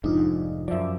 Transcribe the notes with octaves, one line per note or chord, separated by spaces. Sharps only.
F1 F2 G#2 D4 D#4 F4
F#2 F3 D5 E5